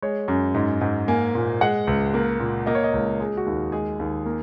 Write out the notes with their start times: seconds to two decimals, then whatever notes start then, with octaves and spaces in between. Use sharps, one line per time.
0.03 G#3 C#5
0.28 F#2
0.54 G#2
0.81 G#2
1.08 A#3 G#5
1.35 A#2
1.61 G#3 F#5
1.87 C#2
2.14 A#3
2.40 A#2
2.66 A#3 D#5
2.75 C#5
2.84 D#5
2.93 C#2
3.20 G#3 G#4
3.37 F#4
3.46 D#2
3.72 G#3 G#4
3.99 D#2
4.26 A#3